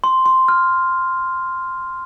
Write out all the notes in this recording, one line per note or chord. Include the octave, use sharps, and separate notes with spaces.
C6
C6
F6